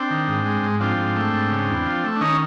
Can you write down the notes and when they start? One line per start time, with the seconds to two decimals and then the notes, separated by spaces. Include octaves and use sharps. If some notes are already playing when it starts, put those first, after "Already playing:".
Already playing: C4 D4
0.10 D#3
0.28 G#2
0.46 G#3
0.63 G#2
0.80 F3 C4 D4
0.98 G#2
1.16 A3
1.33 G#2
1.50 C#3
1.69 E2
1.86 F3
2.04 A3
2.16 D4
2.21 D#3 C#4 D#4